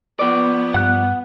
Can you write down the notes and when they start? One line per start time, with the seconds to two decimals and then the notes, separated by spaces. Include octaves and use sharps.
0.19 F3 B3 D5
0.74 G2 F#5 F#6